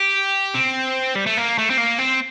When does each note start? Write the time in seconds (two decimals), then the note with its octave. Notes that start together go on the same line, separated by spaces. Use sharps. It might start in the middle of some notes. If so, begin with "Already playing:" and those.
Already playing: G4
0.55 C4
1.15 G3
1.26 A3
1.37 A#3
1.58 A3
1.70 C4
1.77 A#3
1.98 C4